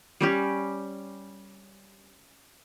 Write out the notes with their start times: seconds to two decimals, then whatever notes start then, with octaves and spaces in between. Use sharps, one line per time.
0.21 G3 C#4 G4